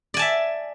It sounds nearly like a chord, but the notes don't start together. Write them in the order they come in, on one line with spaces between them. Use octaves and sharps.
D5 G#5 A5 E5